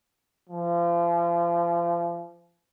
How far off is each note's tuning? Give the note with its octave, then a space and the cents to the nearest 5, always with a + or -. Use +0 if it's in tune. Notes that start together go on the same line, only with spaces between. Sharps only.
F3 -35